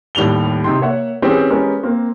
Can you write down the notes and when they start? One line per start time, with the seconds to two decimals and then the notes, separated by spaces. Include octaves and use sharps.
0.15 D#2 A2 G3 F7 G7
0.64 C3 D#4 G5 C6
0.81 A#3 C#5 E5 F#5
1.22 E3 C4 C#4 G4 G#4
1.50 G#3 B3 C#4 G4 A#4
1.83 A#3 C4